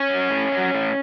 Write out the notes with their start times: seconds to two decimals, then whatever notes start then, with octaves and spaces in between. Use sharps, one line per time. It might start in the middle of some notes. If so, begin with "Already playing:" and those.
Already playing: C#4 C#5
0.10 F#3
0.30 A2
0.52 F#3
0.74 A2